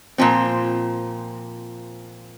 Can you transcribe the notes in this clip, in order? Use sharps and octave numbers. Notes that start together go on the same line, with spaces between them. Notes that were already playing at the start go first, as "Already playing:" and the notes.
A#2 F3 C4